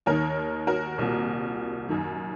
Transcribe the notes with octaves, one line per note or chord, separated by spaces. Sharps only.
D#2 D#3 A#4 C#5
F#4 A#4
C2 A#2
F#2 D#3